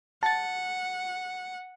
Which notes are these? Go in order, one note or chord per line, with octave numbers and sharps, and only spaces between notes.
F#5 A5 A6